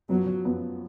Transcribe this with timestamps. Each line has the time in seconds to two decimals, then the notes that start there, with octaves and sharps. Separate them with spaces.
0.09 F#2 F3 F#3 B3
0.45 F#2 F3 B3